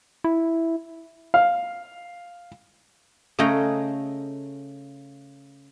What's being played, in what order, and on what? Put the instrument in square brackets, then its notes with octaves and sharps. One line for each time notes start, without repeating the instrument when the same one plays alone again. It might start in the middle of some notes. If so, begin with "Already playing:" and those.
[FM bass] E4
[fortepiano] F5
[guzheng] C#3 A3 G#4 D#5 G5 A#5